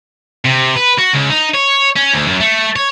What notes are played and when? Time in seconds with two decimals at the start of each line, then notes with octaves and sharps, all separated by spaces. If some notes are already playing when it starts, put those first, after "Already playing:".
0.45 C3
0.75 B4
0.98 F#4
1.13 C#2
1.30 D#4
1.54 C#5
1.96 C#4
2.14 D2
2.27 F#2
2.41 A3
2.76 C#5